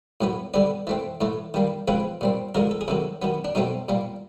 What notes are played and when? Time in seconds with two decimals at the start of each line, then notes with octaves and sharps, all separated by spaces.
0.21 A2 F#3 B3
0.54 D3 G3 B3 D5
0.87 E3 A3 C4
1.21 A2 E3 A3
1.54 D#3 G3 A#3
1.88 C#3 F3 G#3 C4 B4
2.21 A#2 G3 C4
2.55 D3 F3 G#3 A#4
2.71 A4
2.81 G#4
2.88 C3 D#3 F#3 A4
3.22 D#3 F#3 B3
3.45 D4
3.55 B2 F#3 A3 C4 D#4
3.89 A#2 G3 A#3